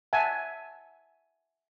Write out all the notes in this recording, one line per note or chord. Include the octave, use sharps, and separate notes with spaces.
E5 F#5 G#5 A5